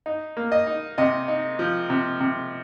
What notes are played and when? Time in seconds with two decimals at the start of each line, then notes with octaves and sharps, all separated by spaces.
0.06 D#4
0.37 A#3
0.52 D#5
0.67 D#4
0.98 C3 D#5
1.28 D#4
1.59 F3
1.90 C3
2.20 C3